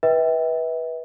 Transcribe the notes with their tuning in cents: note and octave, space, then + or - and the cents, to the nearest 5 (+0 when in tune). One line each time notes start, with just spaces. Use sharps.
B4 -20 E5 -35 G5 +0